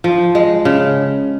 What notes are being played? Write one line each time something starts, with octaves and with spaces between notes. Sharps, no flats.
F3
G#3
C#3